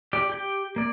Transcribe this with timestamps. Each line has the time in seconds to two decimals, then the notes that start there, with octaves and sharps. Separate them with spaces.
0.13 G4 D5
0.30 G4 G5
0.76 A#3 D5